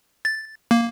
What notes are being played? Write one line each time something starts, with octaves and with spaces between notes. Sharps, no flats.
A6
A#3